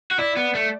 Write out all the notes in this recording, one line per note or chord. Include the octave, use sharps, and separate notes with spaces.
F#4
E4 D5
B3
A3